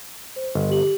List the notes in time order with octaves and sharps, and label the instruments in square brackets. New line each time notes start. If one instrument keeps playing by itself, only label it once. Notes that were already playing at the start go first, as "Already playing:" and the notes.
[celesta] C5
[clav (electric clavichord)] G1 [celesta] D#5
[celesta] G4 F#7